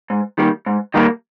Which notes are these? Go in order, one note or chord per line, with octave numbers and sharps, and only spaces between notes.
G#2
D#3 G3 A#3
G#2
D#3 G3 A#3